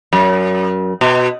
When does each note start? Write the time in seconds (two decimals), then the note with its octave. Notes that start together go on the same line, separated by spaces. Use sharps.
0.13 F#2
1.01 B2